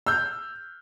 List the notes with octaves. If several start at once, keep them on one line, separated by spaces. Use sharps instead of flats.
E6 F6 G6